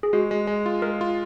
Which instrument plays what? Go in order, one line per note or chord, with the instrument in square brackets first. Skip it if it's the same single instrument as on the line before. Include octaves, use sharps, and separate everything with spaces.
[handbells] G#4
[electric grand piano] G#3 [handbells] F#4
[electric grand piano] G#3
G#3
F4
[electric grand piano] G#3 [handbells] A#4
[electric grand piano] F4